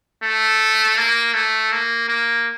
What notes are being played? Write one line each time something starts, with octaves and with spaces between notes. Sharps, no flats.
A3
A#3
A3
A#3
A#3